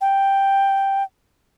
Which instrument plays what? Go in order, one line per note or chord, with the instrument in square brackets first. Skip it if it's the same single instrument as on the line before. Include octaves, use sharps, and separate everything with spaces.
[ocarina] G5